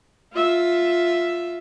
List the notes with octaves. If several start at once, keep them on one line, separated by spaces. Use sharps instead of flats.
F4 E5